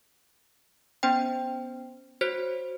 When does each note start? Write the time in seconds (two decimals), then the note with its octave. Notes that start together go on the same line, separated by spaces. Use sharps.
1.03 B3 C#4 C5 G5
2.21 F#4 C5 C#5 B6